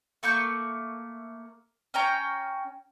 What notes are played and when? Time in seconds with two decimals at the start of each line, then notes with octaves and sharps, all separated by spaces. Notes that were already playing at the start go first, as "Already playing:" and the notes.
0.23 A3 A#3 C#6 G6
1.94 C#4 G5 A#5